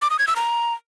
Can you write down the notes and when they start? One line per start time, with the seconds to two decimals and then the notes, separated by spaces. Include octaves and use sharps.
0.02 D6
0.10 D#6
0.19 G#6
0.27 E6
0.36 A#5